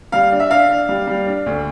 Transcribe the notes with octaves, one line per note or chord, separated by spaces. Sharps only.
G3 F5
D4
E5
D4 F5
D4
G3
G3
D4
D2